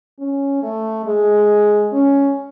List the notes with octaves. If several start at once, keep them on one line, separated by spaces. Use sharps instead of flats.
C#4
A3
G#3
C#4